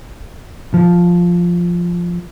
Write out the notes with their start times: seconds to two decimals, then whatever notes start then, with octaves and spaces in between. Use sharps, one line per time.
0.74 F3